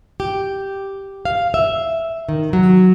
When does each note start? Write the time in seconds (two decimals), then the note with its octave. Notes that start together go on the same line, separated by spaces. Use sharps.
0.20 G4
1.25 F5
1.54 E5
2.29 D#3
2.53 F#3